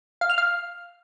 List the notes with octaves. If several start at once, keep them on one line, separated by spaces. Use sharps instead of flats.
F5
F6
F5